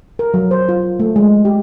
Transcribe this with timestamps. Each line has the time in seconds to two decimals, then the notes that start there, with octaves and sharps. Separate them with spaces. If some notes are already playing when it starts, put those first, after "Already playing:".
0.19 A#4
0.34 F#3
0.51 C5
0.69 F4
1.00 A3
1.16 G#3
1.45 G4